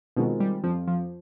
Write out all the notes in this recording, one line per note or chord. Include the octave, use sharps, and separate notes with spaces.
B2 D#3 G#3 C4 F4
G3
F2 F3
F3